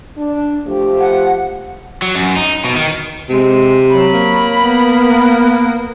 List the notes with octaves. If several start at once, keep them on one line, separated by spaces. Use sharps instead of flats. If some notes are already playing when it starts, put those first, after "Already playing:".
D4
F3 A3 G4
F#5
F#3
F#2
D#4
B2
D#3
C3 G#3
F#3 B5
A#3
B3